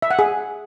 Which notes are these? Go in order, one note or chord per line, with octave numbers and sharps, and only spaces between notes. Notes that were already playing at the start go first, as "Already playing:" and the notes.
E5
F#5
G#4